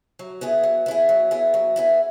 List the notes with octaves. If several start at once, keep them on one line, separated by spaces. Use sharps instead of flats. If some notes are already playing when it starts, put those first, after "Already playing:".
F#3
B3 E4 G#4
F#3
B3 E4 G#4
F#3
B3 E4 G#4
F#3
B3 E4 G#4